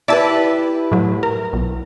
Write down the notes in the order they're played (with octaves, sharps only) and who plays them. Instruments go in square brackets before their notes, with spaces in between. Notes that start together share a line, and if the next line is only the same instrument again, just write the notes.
[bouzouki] E4 G4 B4 [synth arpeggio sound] D5 E5 A5
[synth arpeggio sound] A2 F#3
A#4
B1